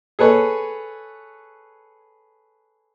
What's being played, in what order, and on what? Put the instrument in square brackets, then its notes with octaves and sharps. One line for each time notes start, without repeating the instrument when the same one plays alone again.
[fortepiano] G#4 A4 B4 C#5